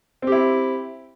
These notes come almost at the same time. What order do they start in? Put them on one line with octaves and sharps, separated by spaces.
C4 G4 E4